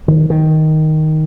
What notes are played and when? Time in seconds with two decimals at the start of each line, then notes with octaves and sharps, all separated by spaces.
0.08 D#3
0.30 D#3